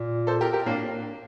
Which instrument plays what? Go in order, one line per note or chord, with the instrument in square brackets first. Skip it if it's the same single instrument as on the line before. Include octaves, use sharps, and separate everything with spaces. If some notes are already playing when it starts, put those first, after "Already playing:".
Already playing: [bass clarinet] A#2
[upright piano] A4 C5
G4 A#4
G4 A#4
[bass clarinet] A2 [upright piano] A#3 D4